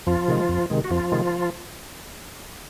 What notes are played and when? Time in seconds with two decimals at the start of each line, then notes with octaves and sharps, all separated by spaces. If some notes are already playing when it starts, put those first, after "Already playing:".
0.07 F2 F3 F4
0.28 C3 D#3 G#3
0.49 F2
0.70 C3 D#3 G#3
0.84 F#4
0.90 F2 F3 F4
1.12 C3 D#3 G#3